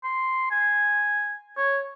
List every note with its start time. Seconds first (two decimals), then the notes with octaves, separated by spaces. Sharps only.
0.04 C6
0.51 G#5
1.57 C#5